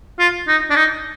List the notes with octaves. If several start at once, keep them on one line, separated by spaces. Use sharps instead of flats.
F4
D#4
D4
D#4